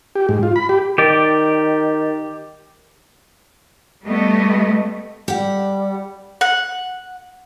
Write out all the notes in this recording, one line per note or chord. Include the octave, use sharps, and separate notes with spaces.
G4
G#2
F4
B5
G4
D#3 G4 D5
G3 A3 B3 D#5
G3 G4 F#5
F#5